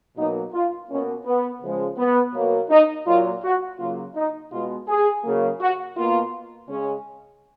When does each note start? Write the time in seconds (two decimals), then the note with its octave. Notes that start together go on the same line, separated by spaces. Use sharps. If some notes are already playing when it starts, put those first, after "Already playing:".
0.17 B2 F#3 A#3 D#4
0.53 F4
0.89 B2 A#3 C#4
1.26 B3
1.62 C#3 F3 G#3
1.98 B3
2.34 B2 F#3 A#3
2.70 D#4
3.07 A#2 F#3 A#3 F4
3.44 F#4
3.79 C#3 F#3 A#3 F4
4.16 D#4
4.52 B2 G#3 F4
4.88 G#4
5.24 C#3 F#3 A#3
5.60 F#4
5.96 B2 A#3 F4
6.69 C#3 G#3 C#4